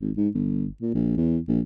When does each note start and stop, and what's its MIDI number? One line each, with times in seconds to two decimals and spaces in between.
0.01 0.11 32
0.17 0.28 44
0.34 0.66 31
0.81 0.92 46
0.94 1.12 34
1.17 1.38 40
1.48 1.60 34